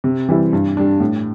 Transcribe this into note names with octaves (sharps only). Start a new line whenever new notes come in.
C3
E3 G3 C4 E4
G2
G3 D4
A2